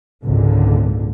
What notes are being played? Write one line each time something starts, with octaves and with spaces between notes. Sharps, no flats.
G#1 C#2 A#2 D3